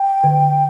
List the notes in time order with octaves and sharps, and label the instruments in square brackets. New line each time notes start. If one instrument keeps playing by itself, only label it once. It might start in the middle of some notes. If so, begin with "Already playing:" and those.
Already playing: [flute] G5
[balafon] D3